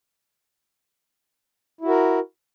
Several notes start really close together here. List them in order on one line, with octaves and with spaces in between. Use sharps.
E4 F#4 A#4